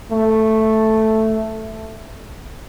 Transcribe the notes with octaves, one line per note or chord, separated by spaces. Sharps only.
A3